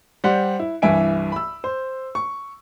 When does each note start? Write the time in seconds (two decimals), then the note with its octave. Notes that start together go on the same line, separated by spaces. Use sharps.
0.24 G3 C5 F#5
0.59 E4
0.82 C2 G2 E3 E5 G#5 D7
1.32 B5 E6
1.64 C5
2.15 C#6